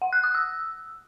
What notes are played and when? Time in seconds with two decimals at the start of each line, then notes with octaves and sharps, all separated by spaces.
0.02 F#5
0.13 F#6
0.24 D#6
0.35 E6